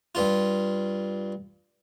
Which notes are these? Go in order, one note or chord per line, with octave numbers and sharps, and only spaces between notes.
G2 F4